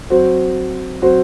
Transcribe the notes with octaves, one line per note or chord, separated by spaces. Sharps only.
F#3 C4 F#4 C5
F#3 C4 F#4 C5